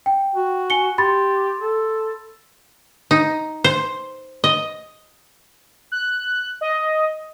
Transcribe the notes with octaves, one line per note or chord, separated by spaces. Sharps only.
G5
F#4
G#5 C#7 G7
G4 B5 C6 A6
A4
D#4
C5
D#5
F#6
D#5